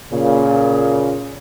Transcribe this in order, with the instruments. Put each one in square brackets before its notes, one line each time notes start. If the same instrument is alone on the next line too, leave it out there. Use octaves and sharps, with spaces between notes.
[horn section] A#2 C#3